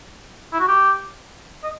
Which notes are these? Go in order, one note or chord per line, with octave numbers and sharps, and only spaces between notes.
E4
F#4
G4
D#5